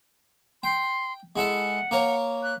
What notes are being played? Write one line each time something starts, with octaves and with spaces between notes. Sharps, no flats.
G5 C6
G#3 E4 A4 F#5
A#3 A#4 C#5
F#6